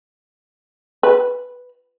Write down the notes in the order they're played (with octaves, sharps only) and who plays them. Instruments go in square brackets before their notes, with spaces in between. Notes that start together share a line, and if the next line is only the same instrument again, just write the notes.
[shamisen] B4